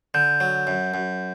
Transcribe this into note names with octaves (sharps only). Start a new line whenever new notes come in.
D3 G6
F#3
F#2
F#2